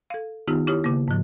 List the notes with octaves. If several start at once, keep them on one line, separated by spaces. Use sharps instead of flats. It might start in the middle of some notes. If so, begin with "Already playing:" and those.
A4 F5
D#3 B3 D#4 F4 G4
E4 G4 C#5 D#6
C#3 A#3
G#2 F3